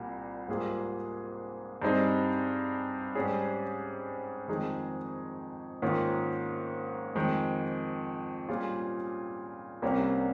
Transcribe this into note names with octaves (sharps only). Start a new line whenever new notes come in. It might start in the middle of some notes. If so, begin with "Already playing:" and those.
Already playing: C2 A#2 G3
G#2 G3 A#3 F4 G#4
G2 G3 C4 D#4 G#4
G#2 G3 C#4 G#4
F2 D#3 G#3 D#4 G#4
G#2 D#3 A#3 C#4 F4
F2 D#3 G#3
A#2 G3 C#4 F4 G#4
C2 C3 G3 A#3 C#4